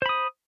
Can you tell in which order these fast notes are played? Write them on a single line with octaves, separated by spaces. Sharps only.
C5 B5 D#6